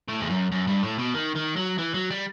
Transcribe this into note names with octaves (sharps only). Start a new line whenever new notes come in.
A2
E2
F#2
F#2
G2
A2
B2
D#3
D#3
F#3
E3
F#3
G3